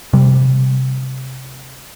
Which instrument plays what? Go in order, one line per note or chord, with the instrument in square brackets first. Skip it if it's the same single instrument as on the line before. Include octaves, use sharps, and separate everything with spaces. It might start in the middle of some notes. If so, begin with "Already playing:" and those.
[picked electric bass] C3 G3